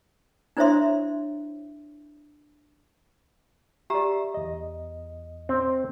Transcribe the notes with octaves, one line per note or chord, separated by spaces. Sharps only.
D4 E4 C5 C#5 E5 C6
G4 D5 E5 A#5
E2 D#5
C4